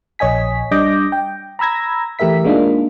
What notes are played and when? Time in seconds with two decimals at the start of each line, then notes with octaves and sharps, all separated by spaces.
0.19 A#1 C#5 D#5 G#5 B6
0.71 G3 D4 D#5 D6 G6 A#6
1.12 G5
1.59 A#5 B5 E6 G#6 A#6
2.19 E3 A3 G4 A#4 E5 B6
2.45 G#3 A#3 D4 D#4 F4